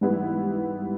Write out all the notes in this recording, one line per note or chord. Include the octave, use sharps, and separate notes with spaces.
G#2 E3 G3 B3 E4